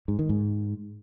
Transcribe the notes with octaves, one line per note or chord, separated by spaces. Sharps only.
G#2
D#3
G#2